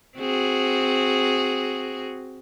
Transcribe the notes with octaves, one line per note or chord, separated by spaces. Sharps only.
C4 F#4 G#4